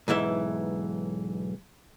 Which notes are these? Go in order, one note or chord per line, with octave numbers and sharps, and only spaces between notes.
B1 G#2 E3 E5